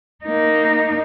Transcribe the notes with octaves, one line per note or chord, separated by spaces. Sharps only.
A#3 D#4